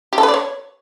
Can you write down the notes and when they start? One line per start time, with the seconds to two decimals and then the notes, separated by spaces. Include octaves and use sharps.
0.13 G4
0.18 A4
0.23 B4
0.28 D5
0.34 C#5